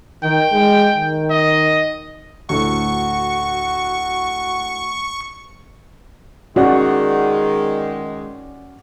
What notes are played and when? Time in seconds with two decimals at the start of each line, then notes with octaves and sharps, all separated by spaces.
0.23 D#3 G5
0.52 G#3
0.95 D#3
1.30 D#5
2.49 D2 A2 F#4 C#6
6.56 D#3 G#3 C#4 F#4 D5 F#5